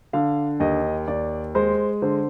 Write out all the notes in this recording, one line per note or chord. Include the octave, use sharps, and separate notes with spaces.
D3 F5
D#2 D#5
D#2 D5
G#3 C5
D3 C5